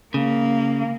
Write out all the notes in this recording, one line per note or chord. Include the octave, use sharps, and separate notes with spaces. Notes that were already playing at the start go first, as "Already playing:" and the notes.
C#3 A#3